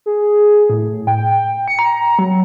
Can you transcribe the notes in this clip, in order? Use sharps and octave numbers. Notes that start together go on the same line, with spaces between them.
G#4
A2
G5
C#7
A#5
F#3